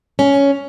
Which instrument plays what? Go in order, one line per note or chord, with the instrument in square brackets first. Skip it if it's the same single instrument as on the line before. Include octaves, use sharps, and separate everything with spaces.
[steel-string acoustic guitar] C#4